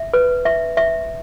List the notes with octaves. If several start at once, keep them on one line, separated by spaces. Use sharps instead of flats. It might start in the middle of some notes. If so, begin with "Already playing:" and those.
Already playing: E5
B4
E5
E5